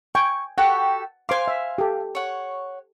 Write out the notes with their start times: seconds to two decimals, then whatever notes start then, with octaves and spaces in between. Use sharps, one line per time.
0.15 G5 G#5 C#6
0.58 F#4 G4 A4 F#5
1.29 C5 F5 G#5 C6 D6
1.48 E5
1.78 G4 A4
2.15 C#5 F#5